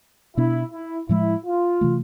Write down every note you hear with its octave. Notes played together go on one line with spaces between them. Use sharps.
B2 B3 D4 E4
E4
A2 F3 G#3 E4
F4
C3 E3 A3